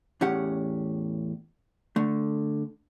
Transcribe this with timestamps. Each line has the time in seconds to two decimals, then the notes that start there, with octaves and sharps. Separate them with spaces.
0.21 E2 A2 C#4 G4 F#5
1.96 D3 A3